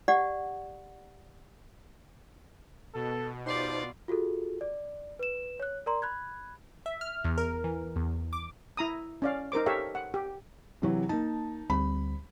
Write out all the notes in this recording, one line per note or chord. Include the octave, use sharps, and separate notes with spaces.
G4 D5 F#5
B2 A4
D#4 F4 G4 C5 D5 C6
F4 F#4 G#4 A4
D5
B4 E7
C#5 F#6
A#4 D5 A#5 C6
B5 F#6 G#6
E5
F6
E2
A#4
E3
E2
D6
E4 A#5 D#6
C#4 D5 F5
D#4 A#4 C5 D6
G4 A4 C#5 E5 F5
F#5
G4
C3 E3 F#3
A#3 D#4 A5
D2 G3 C4 B5